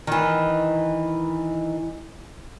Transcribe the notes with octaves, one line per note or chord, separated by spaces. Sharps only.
D#3 E3